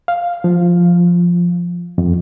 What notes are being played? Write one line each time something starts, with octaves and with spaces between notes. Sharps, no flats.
F5
F3
F2